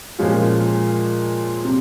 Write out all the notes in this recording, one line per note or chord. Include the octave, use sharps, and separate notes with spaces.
A#2 F3 G#3 C#4 F4
C3